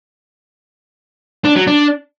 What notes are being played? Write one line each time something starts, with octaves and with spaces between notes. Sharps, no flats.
D4
F#3
D4